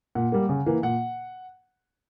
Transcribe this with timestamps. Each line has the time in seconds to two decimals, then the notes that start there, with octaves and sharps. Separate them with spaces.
0.15 A#2 F#5
0.32 G3 A#3
0.49 C#3
0.66 E3 A#3
0.83 A#2 F#5